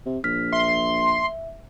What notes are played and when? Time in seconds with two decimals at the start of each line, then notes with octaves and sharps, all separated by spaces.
0.06 C3
0.24 A#1 F6 B6
0.52 E5 C6